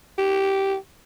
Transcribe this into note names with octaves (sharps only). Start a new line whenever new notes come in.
G4